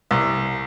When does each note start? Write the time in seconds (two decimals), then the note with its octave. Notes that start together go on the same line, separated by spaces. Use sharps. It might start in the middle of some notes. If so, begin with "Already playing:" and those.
0.11 C2